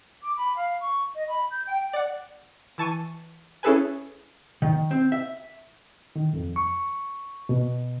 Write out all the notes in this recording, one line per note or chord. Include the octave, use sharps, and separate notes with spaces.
D6
B5
F5
C#6
D#5
B5
G6
G5
D5 F#5
E3 A5 C#6 D#7
C#4 E4 G#4 A4 B4 G#5
D#3
C4
E5
D#3
F2
C#6
B2